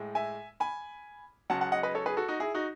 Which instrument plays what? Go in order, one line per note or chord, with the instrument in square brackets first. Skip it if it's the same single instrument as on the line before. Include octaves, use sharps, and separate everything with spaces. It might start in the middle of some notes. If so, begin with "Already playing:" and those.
Already playing: [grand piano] A2 G#3
E5 G#5
G#5 B5
C#2 C#3 F#3 F#5 A5
F#5 A5
D#5 F#5
B4 D#5
A4 C#5
G#4 B4
F#4 A4
D#4 F#4
E4 G#4
D#4 F#4